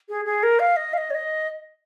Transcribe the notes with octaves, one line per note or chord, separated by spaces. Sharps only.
G#4
G#4
A#4
F5
D#5
F5
D#5
C#5
D#5